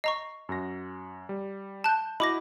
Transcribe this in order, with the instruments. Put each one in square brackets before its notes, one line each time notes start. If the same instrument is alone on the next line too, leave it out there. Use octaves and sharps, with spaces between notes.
[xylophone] D#5 A#5 C#6 [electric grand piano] C7
[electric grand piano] F#2 F#4 A#6
G3
[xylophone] A5 F#6 [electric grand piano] G6 E7
[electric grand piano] E4 F#4 D#5 [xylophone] B5 D6 A#6